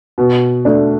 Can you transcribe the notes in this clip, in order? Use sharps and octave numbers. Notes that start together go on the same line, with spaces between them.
B2
A3 D4